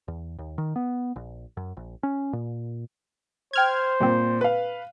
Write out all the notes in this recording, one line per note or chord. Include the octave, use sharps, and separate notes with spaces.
E2
D#2
D#3
B3
A#1
F#2
A#1
C#4
A#2
C5 G5 F6 G#6
G2 A#2 C4
B4 F5